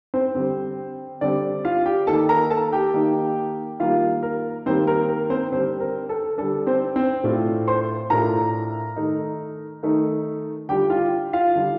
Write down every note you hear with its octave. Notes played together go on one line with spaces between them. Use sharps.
C4 C5
D3 G3 C4
D3 G3 C4 D4 D5
F4 F5
G4 G5
D#3 A#3 D#4 A4 A5
A#4 A#5
A4 A5
G4 G5
D#3 A#3 D#4
D#3 G3 A#3 F4 F5
A#4
D#3 G3 A#3 C4 C5
A#4
A#4
C4 C5
D3 G3 C4 D4 C5
A#4
A4
D3 G3 D4 A4
C4 C5
C4 C5
A2 A3 D4 F4
C5 C6
A2 A3 D4 F4 A#4 A#5
D#3 A3 D#4
D#3 A3 D#4
D3 G3 D4 F4 G4 G5
F4 F5
F4 F5
D3 G3 D4 F4